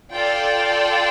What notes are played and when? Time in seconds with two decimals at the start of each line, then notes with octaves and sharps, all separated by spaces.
0.13 F4 A4 D5 G5